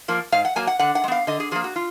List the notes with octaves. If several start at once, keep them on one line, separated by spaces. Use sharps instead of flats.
F3 A#3
G#2 F5
F#5
F#3 A#3 G#5
F#5
D3 F#5
F#5
G#3
B3 F5
D3 D#5
G#4
F3 A#3 G#4
F#4
F4